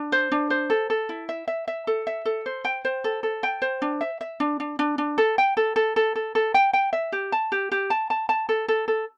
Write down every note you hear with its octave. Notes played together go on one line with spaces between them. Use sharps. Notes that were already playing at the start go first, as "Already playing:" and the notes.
Already playing: D4
C5
D4
C5
A4
A4
E4
E5
E5
E5
A4
E5
A4
C5
G5
C5
A4
A4
G5
C5
D4
E5
E5
D4
D4
D4
D4
A4
G5
A4
A4
A4
A4
A4
G5
G5
E5
G4
A5
G4
G4
A5
A5
A5
A4
A4
A4